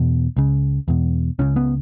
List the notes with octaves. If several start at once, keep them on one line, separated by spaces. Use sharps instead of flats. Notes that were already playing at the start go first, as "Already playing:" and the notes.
Already playing: E2 B2
C#2 C#3
E2 B2
C#2 C#3 C#4
B3